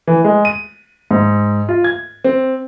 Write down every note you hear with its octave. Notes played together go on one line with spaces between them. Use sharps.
E3
G#3
D#7
G#2
F4
G#6
C4